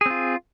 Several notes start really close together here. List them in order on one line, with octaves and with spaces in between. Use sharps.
G#4 C4 F4